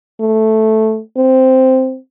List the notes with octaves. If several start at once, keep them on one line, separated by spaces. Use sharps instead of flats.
A3
C4